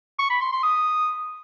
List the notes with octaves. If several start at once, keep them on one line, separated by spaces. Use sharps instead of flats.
C#6
B5
C6
C6
D#6